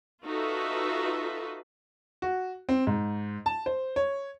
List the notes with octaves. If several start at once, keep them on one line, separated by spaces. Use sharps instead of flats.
D#4 F4 F#4 A4 B4 E5
F#4
C4
G#2
A5
C5
C#5